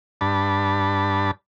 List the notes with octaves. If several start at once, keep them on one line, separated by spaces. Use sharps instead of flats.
G2 D4 A5 B5